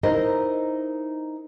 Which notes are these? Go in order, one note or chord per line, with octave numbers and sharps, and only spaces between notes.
D#4 E4 A#4 C5 D#5